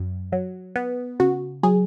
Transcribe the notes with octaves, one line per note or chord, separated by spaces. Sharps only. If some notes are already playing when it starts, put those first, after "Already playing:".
Already playing: F#2
F#3
B3
C#3 F#4
F#3 G#4